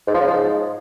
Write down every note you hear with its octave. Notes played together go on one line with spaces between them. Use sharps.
G#2
F3
C#3
F3
G#2